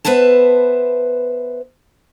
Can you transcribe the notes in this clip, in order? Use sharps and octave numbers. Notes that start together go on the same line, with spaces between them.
B3 B4 C5 E5 A5